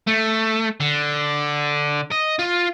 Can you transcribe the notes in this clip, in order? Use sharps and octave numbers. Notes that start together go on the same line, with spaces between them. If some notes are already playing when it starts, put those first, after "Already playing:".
A3
D3
D#5
F4